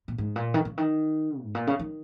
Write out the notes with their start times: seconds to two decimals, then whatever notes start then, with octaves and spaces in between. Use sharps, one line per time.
0.08 A#2
0.18 G#2
0.36 A#2
0.54 D#3
0.65 C#3
0.78 D#3
1.43 G#2
1.55 A#2
1.67 C#3
1.79 D#3